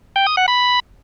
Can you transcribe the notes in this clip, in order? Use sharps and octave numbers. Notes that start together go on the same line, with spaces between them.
G5
D#6
F#5
B5